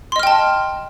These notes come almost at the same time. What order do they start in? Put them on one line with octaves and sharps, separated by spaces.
C6 D#5 F6 G5 A5